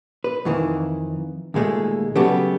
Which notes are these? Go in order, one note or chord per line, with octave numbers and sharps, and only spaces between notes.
B4
F2 D#3 E3
D#2 A#2 G#3 A3
C#3 F#3 G3 A3 B3 G4